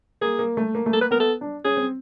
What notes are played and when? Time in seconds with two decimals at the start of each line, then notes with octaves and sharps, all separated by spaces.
0.21 A#3 G#4
0.39 A#3
0.57 A3
0.75 A#3
0.86 A3
0.93 A#3 A4
1.01 B4
1.11 B3 A#4
1.20 A4
1.41 D4
1.64 C#4 G#4
1.77 C4